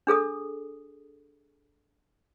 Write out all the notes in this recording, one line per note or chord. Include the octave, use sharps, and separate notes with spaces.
D4 G#4 A4 D#6